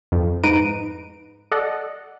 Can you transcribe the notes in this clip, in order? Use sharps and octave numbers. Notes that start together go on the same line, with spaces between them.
F2
G#2 D#4 B4 A#5 D7 D#7
A4 D5 D#5 F#5